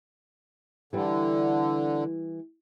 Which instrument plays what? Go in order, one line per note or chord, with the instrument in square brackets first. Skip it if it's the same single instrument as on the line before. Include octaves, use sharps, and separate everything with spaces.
[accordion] D3 [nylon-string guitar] E3 G3